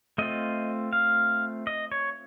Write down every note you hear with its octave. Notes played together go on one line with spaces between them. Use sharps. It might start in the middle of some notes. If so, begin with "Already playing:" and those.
A3 C4 F4 D#5
F5
D#5
C#5